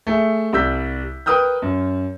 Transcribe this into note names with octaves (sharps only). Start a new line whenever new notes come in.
A3 G#4 E5
C2 G3 E6 G6 B6
A#4 B4 G5 D#6 F6 G6
F#2